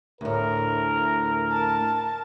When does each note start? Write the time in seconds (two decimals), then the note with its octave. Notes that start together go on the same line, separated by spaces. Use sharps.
0.21 D2 A2 A#4
1.52 A5